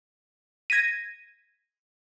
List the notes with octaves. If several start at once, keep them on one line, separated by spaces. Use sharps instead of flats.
G#6 A#6 B6 D#7